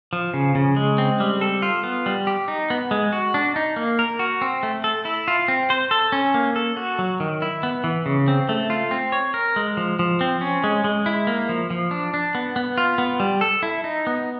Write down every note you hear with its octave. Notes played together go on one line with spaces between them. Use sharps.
F3
C#3
C#3
G#3
C4
G3
A4
F4
B3
G3
G4
D#4
B3
G#3
F#4
D4
D#4
A#3
A#4
F#4
C4
A3
A4
E4
F4
C4
C5
A4
C#4
A#3
A4
F#4
F#3
D#3
E4
B3
E3
C#3
C4
A3
F4
C4
C#5
A#4
G#3
F3
F3
C4
C#4
G#3
G#3
E4
A#3
F3
F3
D4
D4
B3
B3
F4
B3
G3
A4
E4
D#4
B3